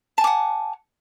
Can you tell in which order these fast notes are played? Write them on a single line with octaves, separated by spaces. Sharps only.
A5 G#5 D6 F#5